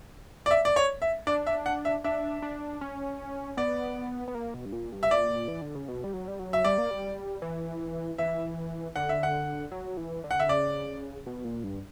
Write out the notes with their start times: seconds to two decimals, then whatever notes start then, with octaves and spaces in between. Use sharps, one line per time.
0.46 D5
0.51 E5
0.65 D5
0.76 C#5
1.02 E5
1.27 D4 D5
1.47 E5
1.66 F#5
1.85 E5
2.04 D4 E5
2.42 D4
2.81 C#4
3.57 B3 D5
4.28 B3
4.35 A#3
4.54 B2
4.65 G2
4.72 A#2
4.92 G2
5.03 E5
5.11 A#2 D5
5.48 E3
5.62 D3
5.75 C#3
5.88 B2
6.04 G3
6.13 F#3
6.28 G3
6.39 F#3
6.53 E5
6.65 G3 D5
6.78 A#3
6.91 G3
7.42 E3
8.18 E3 E5
8.96 D3 F#5
9.09 E5
9.23 F#5
9.72 F#3
9.97 E3
10.24 D3
10.31 F#5
10.40 E5
10.48 C#3 D5
11.26 B2
11.44 A#2
11.64 G2